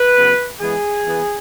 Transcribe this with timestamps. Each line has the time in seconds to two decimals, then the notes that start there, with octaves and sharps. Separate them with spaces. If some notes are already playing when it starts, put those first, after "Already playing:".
Already playing: B4
0.15 C#3 F#3 B3
0.60 E3 G#3 B3 G#4
1.06 E3 B3